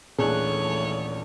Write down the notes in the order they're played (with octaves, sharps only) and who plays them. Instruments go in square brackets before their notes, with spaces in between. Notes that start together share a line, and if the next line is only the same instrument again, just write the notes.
[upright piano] D#1 A#1 [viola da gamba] E3 A3 [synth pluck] G#4 A4 F#6 [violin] C#5